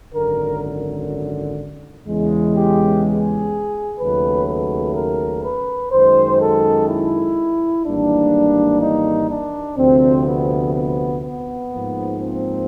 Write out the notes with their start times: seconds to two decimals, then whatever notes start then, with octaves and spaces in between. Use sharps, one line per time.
0.15 G#1 F#2 D3 A#4
2.07 E2 C#3 E3 G#3
2.56 G4
3.03 G#4
3.99 D#2 C#3 F#3 A3 B4
4.48 B4
4.96 A#4
5.45 B4
5.92 F#2 D#3 G#3 C5
6.41 A4
6.89 E4
7.85 G#1 G#2 E3 G3 A#3 D4
8.82 D#4
9.31 D4
9.78 D2 C3 F3 C4
10.26 B3
10.75 B3
11.23 B3
11.71 G#2 F3 A#3
12.20 C4